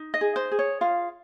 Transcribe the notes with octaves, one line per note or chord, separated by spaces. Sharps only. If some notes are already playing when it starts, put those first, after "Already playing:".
Already playing: D#4
D#5
G#4
C5
G#4
C#5
F4 F5